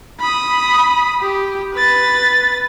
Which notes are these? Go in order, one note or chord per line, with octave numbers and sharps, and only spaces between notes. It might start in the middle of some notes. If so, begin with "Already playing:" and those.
B5 D#6
G4
B4 A6